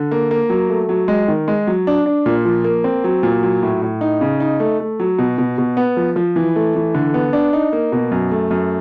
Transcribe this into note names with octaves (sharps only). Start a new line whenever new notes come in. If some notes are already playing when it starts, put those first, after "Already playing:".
Already playing: D3
A#3
A#3
F#3
A3
F#3
G#3
D#3
G#3
F#3
D4
D4
A#2
F3
A#3
C4
F#3
A#2
F#3
A2
A2
D#4
C#3
D#4
A3
A3
F#3
B2
B2
B2
B3
F3
F3
E3
A3
E3
D3
B3
D4
D#4
A#3
B2
F#2
A3
F#2